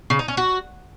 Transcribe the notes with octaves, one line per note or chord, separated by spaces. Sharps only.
C#3
D#4
C#4
F#4